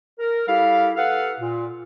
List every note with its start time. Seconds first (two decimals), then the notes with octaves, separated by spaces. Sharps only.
0.19 A#4
0.46 G3 E4 G4 A4 F5
0.96 A4 B4 F5 F#5
1.40 A#2